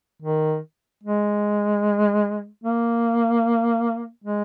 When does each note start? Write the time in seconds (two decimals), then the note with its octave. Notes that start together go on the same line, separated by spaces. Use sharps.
0.22 D#3
1.04 G#3
2.64 A#3
4.24 G#3